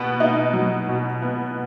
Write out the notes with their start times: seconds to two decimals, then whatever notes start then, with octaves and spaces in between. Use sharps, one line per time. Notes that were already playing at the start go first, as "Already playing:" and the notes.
Already playing: B2 B3
0.20 D#4
0.53 F#3
0.89 B2
1.22 B3